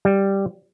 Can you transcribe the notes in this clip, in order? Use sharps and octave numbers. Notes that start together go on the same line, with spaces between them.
G3